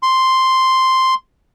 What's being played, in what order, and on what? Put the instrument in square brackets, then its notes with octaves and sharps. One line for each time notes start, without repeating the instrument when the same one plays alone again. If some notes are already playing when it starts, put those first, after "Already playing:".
[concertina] C6